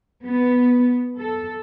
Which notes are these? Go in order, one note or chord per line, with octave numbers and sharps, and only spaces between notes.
B3
A4